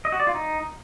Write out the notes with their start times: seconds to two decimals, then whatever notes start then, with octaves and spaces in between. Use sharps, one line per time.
0.05 D#5
0.12 F#4
0.20 D5
0.27 F4
0.34 D#4